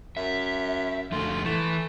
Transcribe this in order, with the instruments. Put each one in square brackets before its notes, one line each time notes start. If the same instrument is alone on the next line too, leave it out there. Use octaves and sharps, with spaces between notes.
[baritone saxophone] F#2 [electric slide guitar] E5
[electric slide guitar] F2 D3 A3 [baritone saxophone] F4
[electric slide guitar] E3 [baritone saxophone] A3